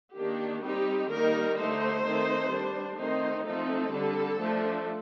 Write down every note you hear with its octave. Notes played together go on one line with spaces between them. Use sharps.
D#3 A#3 D4 G4
G3 C4 D#4 G4
D#3 G3 A#3 D#4 A#4
D3 A3 D#4 C5
D#3 A3 C4 D#4
G3 D4
D#3 A3 C4 D#4 C5
F3 A3 C4 D#4 A4
D3 G3 D4
F3 A3 D4